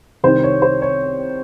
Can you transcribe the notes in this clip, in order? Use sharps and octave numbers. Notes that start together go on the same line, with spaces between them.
C2 C3 D#3 C5
C#5
C5
C#5